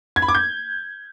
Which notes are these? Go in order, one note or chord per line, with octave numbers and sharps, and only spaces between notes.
G#6
B5
D6
G6